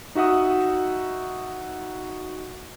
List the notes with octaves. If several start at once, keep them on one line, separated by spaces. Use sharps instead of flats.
D#4 F#4 E5 F#5 D#6